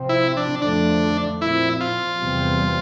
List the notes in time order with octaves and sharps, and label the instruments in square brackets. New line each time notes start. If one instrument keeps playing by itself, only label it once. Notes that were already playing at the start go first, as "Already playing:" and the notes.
Already playing: [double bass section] C3 F3 C4
[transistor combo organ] E4
D4
[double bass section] F2 D3 F3 A3 [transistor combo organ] D4
[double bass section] A#2 F3 C4 [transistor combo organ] E4
[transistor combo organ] F4
[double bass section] E2 C3 G3 C4